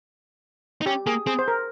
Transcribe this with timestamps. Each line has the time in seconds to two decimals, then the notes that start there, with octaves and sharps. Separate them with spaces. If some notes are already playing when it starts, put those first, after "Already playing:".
0.81 D#4
0.86 C#4 G4
1.07 A#3 G#4
1.27 C4 G#4
1.39 C5
1.48 A#4